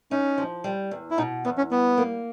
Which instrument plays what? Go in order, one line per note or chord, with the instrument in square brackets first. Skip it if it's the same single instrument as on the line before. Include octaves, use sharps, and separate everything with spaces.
[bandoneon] C#4 [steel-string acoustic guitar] D#4
[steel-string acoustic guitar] F3
G3
E2
[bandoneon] E4
[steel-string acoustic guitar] B2 [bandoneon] D#4
[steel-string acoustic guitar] E2 [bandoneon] B3
[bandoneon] C#4
[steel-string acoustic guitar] G3 [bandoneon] B3
[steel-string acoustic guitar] A#3